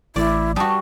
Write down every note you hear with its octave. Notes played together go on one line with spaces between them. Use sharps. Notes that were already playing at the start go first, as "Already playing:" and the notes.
A1 E3 A3 E4 D5
G3 F#4 A5 D#6